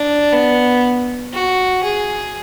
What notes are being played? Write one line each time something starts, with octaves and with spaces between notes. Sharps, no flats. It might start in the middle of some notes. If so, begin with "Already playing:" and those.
Already playing: D4
B3
F#4
G#4